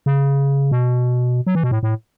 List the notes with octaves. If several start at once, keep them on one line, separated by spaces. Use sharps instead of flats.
C#3
B2
F#3
E3
B2
A2
A2